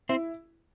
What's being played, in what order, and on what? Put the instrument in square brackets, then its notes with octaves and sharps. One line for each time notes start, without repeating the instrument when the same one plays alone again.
[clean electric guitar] C4 C5 [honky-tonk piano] E4